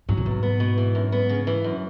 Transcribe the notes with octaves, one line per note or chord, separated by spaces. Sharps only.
G#2 F#3
A#2
E2 G#2
B3
B2
E3
F#2
B3
C#3
E3
F#2